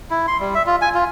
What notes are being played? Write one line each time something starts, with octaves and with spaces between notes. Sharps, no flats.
E4
C6
G3
E5
F4
G#5
F4